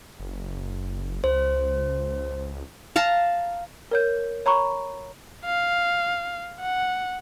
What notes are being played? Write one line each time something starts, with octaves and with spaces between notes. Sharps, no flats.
F#1
C#2 C5
F5 A5 A#5
A#4 C#5 G6
C#5 A#5 B5 C#6
F5
F#5